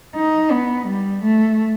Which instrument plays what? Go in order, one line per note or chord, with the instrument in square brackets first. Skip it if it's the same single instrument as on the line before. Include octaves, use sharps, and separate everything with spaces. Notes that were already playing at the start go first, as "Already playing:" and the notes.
[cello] D#4
B3
G3
A3